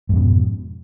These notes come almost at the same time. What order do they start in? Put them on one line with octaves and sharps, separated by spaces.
G#2 F2 B2